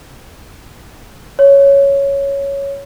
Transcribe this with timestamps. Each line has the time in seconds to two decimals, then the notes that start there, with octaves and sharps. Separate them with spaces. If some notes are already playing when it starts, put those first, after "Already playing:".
1.39 C#5